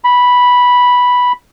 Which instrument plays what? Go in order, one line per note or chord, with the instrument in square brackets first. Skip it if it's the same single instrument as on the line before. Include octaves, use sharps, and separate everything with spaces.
[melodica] B5